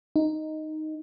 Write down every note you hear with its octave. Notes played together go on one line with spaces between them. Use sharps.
D#4